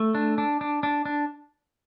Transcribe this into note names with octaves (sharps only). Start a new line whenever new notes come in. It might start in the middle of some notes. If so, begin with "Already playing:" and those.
Already playing: A3
D4
D4
D4
D4
D4